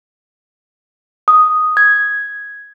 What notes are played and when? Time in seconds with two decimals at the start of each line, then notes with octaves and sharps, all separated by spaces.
1.28 D#6
1.77 G#6